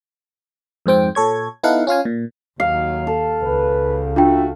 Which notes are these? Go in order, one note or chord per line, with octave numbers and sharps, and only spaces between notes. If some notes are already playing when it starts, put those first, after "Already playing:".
F2 G#2 C4 G5
A#2 A4 C#5 G#6
B3 D#4 E4 A4 F5 F#5
C#4 F4 F5 G#5
A#2
D#2 A2 D#3 F#3 F5 C7
A4
C#2 B4
A3 D4 F4 F#4 G5